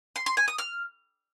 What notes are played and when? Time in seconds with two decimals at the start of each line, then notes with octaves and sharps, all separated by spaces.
0.16 C6
0.26 C6
0.37 G#5
0.48 D#6
0.58 F6